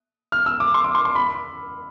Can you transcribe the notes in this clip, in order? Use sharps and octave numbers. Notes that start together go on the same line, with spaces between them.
F6
E6
D6
C6
D6
C6
C6
B5